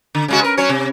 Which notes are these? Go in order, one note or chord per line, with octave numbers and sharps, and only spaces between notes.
D3
C#3 G#3 F#4
A#4 B4
F#3 C#4 C#5
C3